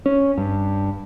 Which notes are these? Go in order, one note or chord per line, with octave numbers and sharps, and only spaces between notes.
C#4
G2